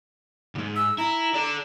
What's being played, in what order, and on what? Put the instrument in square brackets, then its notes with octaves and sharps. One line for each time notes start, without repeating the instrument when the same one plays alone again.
[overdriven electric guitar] C#2 G#2
[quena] E6
[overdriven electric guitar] E4 [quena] A#5
[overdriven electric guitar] A4 D5